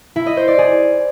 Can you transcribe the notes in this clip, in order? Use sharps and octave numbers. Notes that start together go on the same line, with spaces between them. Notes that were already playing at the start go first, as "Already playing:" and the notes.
E4
D#5
C5
D5
G#4